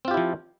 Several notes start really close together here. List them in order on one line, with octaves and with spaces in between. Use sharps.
C4 F4 G4 E4 F3